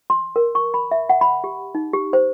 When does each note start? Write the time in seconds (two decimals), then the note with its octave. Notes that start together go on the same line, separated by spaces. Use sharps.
0.10 C6
0.36 A#4
0.55 C#6
0.74 B5
0.91 E5
1.09 F#5
1.21 B5
1.44 G4
1.75 D#4
1.93 G4
2.13 C5